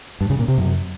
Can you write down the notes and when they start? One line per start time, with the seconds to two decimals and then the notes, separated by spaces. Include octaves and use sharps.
0.21 G2
0.30 C#3
0.39 A#2
0.48 C3
0.58 F#2